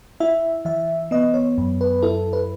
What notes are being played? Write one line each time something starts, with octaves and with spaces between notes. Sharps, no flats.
E4 E5
E3 E5
B3 D#5
C#5
F#2
B4
E4 A4
B4